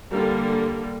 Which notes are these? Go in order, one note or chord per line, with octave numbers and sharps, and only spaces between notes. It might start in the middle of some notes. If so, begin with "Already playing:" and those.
D3 G3 A#3